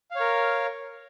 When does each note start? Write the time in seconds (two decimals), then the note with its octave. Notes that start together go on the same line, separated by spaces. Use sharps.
0.11 F5
0.16 C#5
0.20 A#4